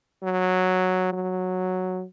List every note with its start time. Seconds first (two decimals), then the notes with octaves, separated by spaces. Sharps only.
0.23 F#3
1.13 F#3